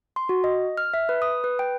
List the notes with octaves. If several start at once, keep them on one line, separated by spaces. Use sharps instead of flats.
C6
F#4
D#5
F6
E5
B4
D#6
B4
G5